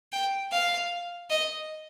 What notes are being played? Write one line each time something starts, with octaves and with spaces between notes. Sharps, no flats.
G5
F5
D#5